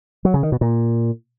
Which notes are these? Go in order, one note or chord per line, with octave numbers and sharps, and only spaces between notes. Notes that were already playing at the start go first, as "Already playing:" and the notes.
F#3
C#3
D#3
B2
A#2